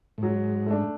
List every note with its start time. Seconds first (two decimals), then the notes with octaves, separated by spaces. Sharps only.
0.18 A2
0.22 G#2 F#3
0.66 A3 D4